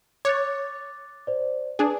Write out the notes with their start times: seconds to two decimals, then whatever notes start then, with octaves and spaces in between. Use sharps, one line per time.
0.25 C#5 D6 F#6 A6
1.27 C5 D5
1.79 D4 G#4 B4 G#5